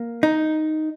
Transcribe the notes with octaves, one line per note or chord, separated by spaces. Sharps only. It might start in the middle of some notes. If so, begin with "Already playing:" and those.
Already playing: A#3
D#4